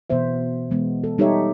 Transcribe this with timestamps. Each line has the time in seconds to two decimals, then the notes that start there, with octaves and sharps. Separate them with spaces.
0.10 B2 E3 B3 C5 E5
0.71 E3 G#3 B3
1.04 A4
1.18 G3 D#4 G4 A4 C#5 E5